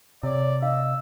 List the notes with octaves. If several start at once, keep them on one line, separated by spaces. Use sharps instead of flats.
C3 C#5 D5
D#5 F5 E6